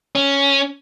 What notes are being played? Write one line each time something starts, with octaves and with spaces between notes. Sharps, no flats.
C#4